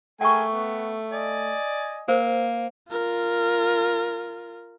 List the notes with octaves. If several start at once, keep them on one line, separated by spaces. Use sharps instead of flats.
A3 G#4 A#4 G5 G#5 C#6
B3
D5 D#5 G#5
A#3 A#4 C5
F4 A#4